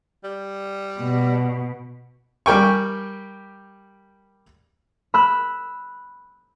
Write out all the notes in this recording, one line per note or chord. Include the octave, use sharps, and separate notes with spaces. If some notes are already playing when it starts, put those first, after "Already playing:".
G3
B2
G3 G4 A#4 G5 G#5 C#6
B5 E6 F#6